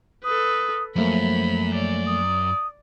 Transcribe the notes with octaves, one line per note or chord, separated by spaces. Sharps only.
A4 B4 D#6
F#2 F3 A3 A#3 C5 B5
C#5 D5
D#6